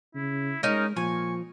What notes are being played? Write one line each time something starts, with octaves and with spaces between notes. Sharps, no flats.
C#3 E4
G#3 C#4 D#4 A#4
A#2 F3 G#5 C#6